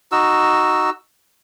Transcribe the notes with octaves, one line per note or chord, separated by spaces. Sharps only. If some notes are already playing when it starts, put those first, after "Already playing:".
D#4 F#4 E6